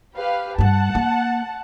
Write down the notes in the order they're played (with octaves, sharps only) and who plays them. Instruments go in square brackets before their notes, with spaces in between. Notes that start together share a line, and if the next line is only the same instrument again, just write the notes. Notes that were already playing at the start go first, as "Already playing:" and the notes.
[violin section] G4 B4 F5
[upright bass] G2 G3 [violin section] F#5 A5
[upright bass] A#3